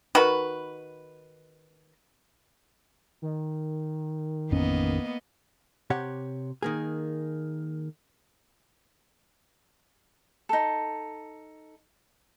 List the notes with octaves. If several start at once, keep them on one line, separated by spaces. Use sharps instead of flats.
D#3 F#4 B4
D#3
A1 F2 A#3 B3 C#4 D#5
C3 G4 C#5 F#5
D#3 A#3 G#4
D#4 A4